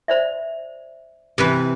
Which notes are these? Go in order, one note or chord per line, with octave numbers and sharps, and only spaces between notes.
C5 D5 E5
C3 E3 B4